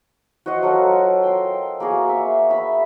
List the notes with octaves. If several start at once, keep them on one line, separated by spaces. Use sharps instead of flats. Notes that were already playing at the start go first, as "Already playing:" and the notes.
F#4 C5 D#5 F#5
F#3 F4 A4 A#4
G5 C6
A#3 F#4 G#4 A#5
E5
E5 B5